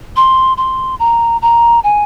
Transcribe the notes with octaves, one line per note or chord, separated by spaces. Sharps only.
C6
C6
A#5
A#5
G#5